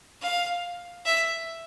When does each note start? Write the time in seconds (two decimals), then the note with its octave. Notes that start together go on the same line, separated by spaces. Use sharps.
0.22 F5
1.06 E5